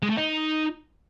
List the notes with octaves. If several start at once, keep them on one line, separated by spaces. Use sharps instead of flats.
G#3
A3
D#4